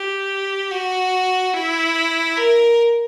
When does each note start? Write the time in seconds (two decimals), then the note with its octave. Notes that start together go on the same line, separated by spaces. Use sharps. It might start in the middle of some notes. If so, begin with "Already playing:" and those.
Already playing: G4
0.71 F#4
1.54 E4
2.37 A#4